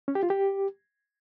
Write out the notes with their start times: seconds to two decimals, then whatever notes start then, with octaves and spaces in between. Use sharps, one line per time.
0.08 C#4
0.15 G4
0.23 F4
0.30 G4